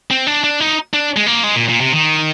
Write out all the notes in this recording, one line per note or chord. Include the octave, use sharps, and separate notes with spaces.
C4
D4
D4
D#4
D4
G#3
A#3
G#3
A#2
A#2
C3
D#3